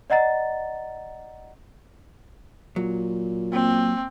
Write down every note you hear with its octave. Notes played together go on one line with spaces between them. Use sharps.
D5 D#5 F#5 A#5 A6
A#2 F#3
A#3 C4